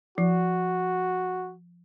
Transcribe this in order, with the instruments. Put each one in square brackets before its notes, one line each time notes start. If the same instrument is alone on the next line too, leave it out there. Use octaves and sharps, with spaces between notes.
[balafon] F3 [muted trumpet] F#4